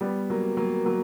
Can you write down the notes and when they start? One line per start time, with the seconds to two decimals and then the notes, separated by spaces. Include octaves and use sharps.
0.01 G3 B3
0.30 F#3 A#3
0.57 F#3 A#3
0.85 F#3 A#3